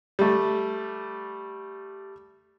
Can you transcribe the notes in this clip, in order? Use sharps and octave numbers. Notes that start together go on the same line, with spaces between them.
G3 A3